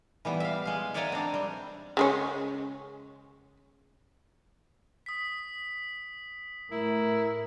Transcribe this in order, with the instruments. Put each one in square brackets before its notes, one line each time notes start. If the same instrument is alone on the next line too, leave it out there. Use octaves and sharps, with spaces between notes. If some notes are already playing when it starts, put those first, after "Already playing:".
[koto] E3 G3 B3
E5 F5
G#3 F5
C#5 D5 E5 F#5 G#5 A#5
C4 D4
G3
[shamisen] C#3 G#3 C#4
[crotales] D#6 B6
[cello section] A2 [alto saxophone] E4 [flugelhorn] A#4